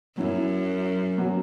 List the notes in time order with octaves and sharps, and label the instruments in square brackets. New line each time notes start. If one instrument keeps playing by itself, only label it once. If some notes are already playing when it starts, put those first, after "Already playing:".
[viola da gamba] F#2 [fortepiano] F#3 C#4 E4
[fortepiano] F#3 C#4 F#4